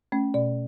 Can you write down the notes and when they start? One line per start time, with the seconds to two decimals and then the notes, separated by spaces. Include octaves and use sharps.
0.12 A3 C#4
0.34 B2 D5